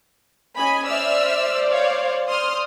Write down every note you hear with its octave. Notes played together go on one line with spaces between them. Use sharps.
C#4 D#5 G#5 B5
C5 D5 E5 E6 F6
C#5 F5
C6 D#6 F6